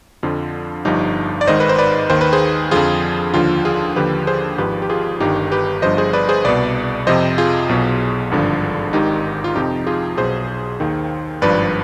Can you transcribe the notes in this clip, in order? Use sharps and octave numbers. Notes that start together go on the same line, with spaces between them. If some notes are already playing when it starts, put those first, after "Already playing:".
F2 D3 F3 F4
G1 G2 F3 D#4 G4
D5
G#1 G#2 D#3 C5 D#5
B4
C5
B4 D5
D#2 D#3 C5
B4
G#4 C5
F2 D3 F3 F4 G#4
D#2 D3 F3 F4
F4 G#4
D#2 D3 F3 G4 B4
G#4 C5
G#1 G#2 F3 G4 B4
G4
F4 G#4
G1 G2 D#3 D#4 G4
G4 B4
G1 G2 F3 C5 D#5
G#4 C5
B4 D5
G#4 C5
C2 B2 B4 D5
F2 C3 F3 C5 D#5
F4 G#4
B1 B2
G#1 G2 D3 F3
G#1 G#2 D#3 D#4 G4
F4
F2 C3 F3 D#4 G4
F4 G#4
B1 B2 G#4 C5
D#2 D#3
G#1 G2 F3 B4 D5